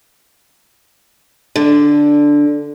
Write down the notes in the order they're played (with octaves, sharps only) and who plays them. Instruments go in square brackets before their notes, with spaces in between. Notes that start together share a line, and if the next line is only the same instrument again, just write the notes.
[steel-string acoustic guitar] D3